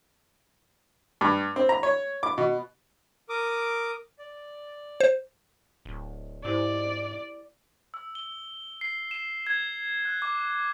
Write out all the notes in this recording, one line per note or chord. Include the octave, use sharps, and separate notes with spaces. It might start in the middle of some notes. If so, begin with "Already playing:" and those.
G2
C4
A#5
C#5
D6
B2
A#4 D6 D#6
D5
C5
D1
G#2 E4 G4 C5 D5
E6
G7
C7
E7
G#6
F#6
D6